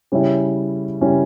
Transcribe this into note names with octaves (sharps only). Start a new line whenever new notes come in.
C#3 G3 C#4 E4
C#3 G3 C#4 E4